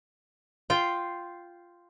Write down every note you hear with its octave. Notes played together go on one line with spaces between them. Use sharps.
F4 G5